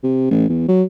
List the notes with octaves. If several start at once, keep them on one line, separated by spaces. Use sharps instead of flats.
C3
A1
E2
F#3